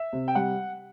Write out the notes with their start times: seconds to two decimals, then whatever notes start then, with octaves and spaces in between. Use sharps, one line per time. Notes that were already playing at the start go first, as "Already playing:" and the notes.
Already playing: E5
0.13 C3
0.28 G5
0.35 G3 F#5